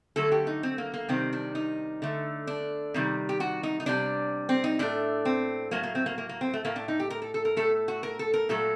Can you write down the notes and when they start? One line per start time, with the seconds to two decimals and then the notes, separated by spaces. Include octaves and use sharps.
0.16 D3 F#3 A3 A4
0.32 G4
0.47 D#4
0.63 C4
0.78 A#3
0.94 A#3
1.09 C3 D#3 G3 C4
1.33 D4
1.55 D#4
2.02 D3 A3
2.47 D4
2.94 C3 D#3 G3
3.29 G4
3.40 F#4
3.63 D#4
3.80 D#4
3.86 C3 G3 D4
4.49 C4
4.64 D#4
4.79 A2 A3 D4
5.25 C4
5.71 A2 F#3 A3 A#3
5.83 A#3
5.95 C4
6.06 A#3
6.18 A#3
6.29 A#3
6.41 C4
6.53 A3
6.65 A2 A3 A#3
6.76 D4
6.88 D#4
7.00 G4
7.10 A#4
7.22 A4
7.34 A4
7.45 A#4
7.57 A2 A3 A4
7.88 F#4
8.03 A#4
8.19 A4
8.34 A#4
8.49 A#2 F#3 A3 A4